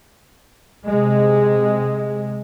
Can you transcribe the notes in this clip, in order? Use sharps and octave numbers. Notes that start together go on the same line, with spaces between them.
C3 G#3